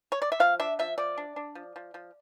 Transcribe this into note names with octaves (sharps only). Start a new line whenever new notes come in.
C#5
D5
E5
F3 F5
D4 E5
F3 E5
F3 D5
D4
D4
F3
F3
F3